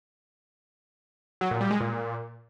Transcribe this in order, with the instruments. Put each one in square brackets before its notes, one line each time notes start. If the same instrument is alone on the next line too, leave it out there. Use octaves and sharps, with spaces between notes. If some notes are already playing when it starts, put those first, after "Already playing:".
[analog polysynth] F#3
A#2
G3
G#3
A#2